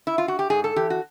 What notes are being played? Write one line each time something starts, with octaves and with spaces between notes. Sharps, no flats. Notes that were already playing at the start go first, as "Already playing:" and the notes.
E4
F4
F#4
G4
G#2 G#4
A4
E3 G4
F#4